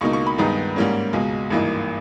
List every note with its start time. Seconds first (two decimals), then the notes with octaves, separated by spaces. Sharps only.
0.01 C#2 B2 A#3 D#4 C#6
0.13 C#6
0.27 B5
0.38 G2 D#3 G#3 B3 D#4 A#5
0.76 G#2 G3 A#3 C#4
1.13 C#2 B2 G#3
1.50 G#1 G2 E3 A#3 D#4